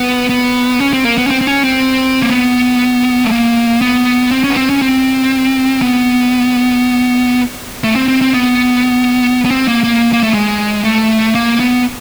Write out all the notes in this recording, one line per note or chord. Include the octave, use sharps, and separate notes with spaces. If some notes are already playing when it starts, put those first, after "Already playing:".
Already playing: B3
B3
C#4
C4
A#3
B3
C#4
C4
C4
C#4
C4
A#3
B3
A3
A#3
B3
C4
C#4
B3
C4
C#4
C4
B3
A3
C4
C4
C4
B3
B3
C4
A#3
A#3
A#3
A3
G#3
A3
A#3
B3